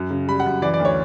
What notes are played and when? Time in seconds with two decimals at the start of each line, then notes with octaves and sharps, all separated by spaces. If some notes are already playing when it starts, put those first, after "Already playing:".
Already playing: F#2
0.10 C#3
0.28 G3 B5
0.40 F#5
0.46 F#2
0.62 E3 D5
0.74 D5
0.79 D2
0.85 C#5